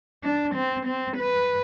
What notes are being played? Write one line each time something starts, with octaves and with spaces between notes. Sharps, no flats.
D4
C4
C4
B4